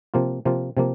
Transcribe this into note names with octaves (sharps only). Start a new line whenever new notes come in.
C3 F3 A#3 F4
C3 F3 A#3 F4
C3 F3 A#3